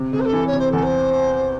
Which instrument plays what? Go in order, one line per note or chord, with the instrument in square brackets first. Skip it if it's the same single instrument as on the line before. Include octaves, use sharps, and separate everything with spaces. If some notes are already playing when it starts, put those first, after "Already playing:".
Already playing: [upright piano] C3
[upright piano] C3 [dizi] G#4
[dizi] C5
A4
[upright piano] E3
[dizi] C#5
[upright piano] C3
[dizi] C5
[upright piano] E2 [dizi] A4
[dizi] C5